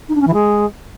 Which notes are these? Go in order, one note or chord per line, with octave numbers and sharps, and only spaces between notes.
D#4
D4
C#4
E3
G#3